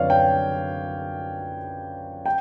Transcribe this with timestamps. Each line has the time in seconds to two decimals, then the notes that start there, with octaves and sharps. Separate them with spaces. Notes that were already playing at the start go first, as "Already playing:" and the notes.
Already playing: F#2 D3 F3 C4 B4 C#5 D5 F5
0.10 G5
2.26 G5